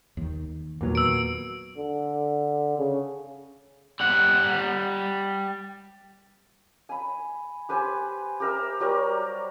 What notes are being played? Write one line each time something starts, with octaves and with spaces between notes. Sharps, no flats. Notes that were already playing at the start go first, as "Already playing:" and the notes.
D#2 D#3
E2 A#2 D#3 F#3 B3
E6 D7
D3
C#3
G3 F#5
G#5 B5
G4 B4 C5 G#5
G4 A#4 E5
F#3 G3 A#4 D5